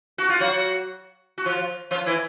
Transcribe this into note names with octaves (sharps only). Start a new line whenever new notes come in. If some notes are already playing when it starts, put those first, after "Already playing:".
F#4
F4
F#3 F#4
F#4
F3 F4
F3 F4
E3 E4